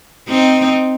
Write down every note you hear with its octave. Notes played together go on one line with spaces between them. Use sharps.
C4 D#4